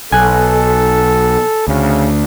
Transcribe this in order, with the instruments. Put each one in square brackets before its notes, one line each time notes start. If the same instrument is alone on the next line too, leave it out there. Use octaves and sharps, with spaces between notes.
[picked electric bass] B1 [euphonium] A4 [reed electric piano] G#5 F#6
[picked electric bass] D2 [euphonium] C#3